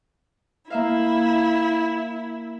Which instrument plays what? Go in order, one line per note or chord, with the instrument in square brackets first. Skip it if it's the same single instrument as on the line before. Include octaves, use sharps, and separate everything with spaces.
[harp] A#3 E5 F5 [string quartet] E4